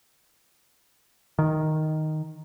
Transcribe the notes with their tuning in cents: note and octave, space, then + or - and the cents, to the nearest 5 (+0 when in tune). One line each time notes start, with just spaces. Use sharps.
D#3 +0